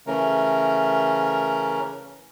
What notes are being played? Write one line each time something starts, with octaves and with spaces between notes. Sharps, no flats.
C#3 E3 A3 C#4 A#4